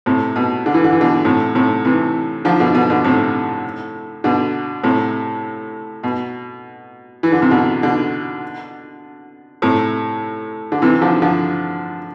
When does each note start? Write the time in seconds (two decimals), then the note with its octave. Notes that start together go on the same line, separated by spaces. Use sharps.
0.06 A2 C3
0.36 B2
0.66 D3
0.74 E3
0.84 D3
0.92 E3
1.01 B2 D3
1.25 A2 C3
1.55 A2 C3
1.85 C3 E3
2.45 D3 F3
2.60 B2 D3
2.75 B2 D3
2.90 B2 D3
3.04 A2 C3
4.24 B2 D3
4.84 A2 C3
6.03 B2
7.23 E3
7.32 D3
7.42 C3
7.51 B2 D3
7.83 B2 D3
9.62 A2 C3
10.72 D3
10.82 C3 E3
11.01 D3 F3
11.22 D3 F3